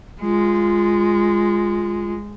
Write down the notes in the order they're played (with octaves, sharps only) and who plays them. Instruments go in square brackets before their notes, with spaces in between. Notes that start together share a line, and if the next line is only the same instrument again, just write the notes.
[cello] G#3 [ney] F4